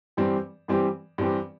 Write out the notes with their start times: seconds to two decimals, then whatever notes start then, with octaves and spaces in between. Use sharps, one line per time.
0.17 G2 E3 G3 C4 G4
0.68 G2 E3 G3 C4 G4
1.18 G2 E3 G3 C4 G4